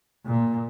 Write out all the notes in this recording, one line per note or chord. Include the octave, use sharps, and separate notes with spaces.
A#2